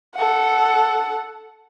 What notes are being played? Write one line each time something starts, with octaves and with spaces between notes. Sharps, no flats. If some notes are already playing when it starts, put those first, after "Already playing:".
A4 F#5